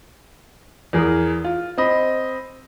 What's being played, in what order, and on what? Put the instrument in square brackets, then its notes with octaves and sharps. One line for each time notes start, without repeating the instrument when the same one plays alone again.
[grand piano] E2 G#4 A#4
F4
C4 D#5 B5